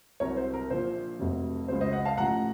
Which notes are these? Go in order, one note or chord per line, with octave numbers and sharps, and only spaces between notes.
C2 C3 F#3 A#4 C#5
C5
A#4
A#1 A#2 F3 C5
F1 F2 C3 F#3
C#2 C#3 F#3 C5
C5 D#5
D#5 F#5
F5 A5
A1 A2 F3 F#5 A#5